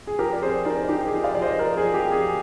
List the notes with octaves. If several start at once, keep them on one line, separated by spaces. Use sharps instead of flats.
G#4
F3 G4 A#4
D5
C4 G#4 C5
D#4 A#4 D5
D#4 G4
G#4
F3
D5 F5
F3 D5
C5 D#5
F3 A#4 D5
G#4
F3
G4
C4
G#4